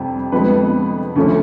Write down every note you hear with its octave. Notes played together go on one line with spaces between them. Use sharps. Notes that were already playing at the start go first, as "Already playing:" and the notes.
Already playing: F2 C3 G3
F2 D3 F3 G#3 B3 B4
D2 C#3 F3 A3 C#4